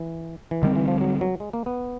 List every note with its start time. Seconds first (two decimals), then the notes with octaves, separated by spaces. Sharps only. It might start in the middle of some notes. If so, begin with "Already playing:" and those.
Already playing: E3
0.51 E3
0.63 D3 D#3 G3 C4
0.76 E3
0.88 F3
1.01 F#3
1.21 F#3
1.40 G#3
1.53 A#3
1.66 B3